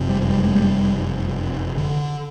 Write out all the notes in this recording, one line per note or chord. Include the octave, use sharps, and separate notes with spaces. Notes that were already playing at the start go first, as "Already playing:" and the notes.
Already playing: F#1 F2 C3
G3
G3
G#3
G3
D3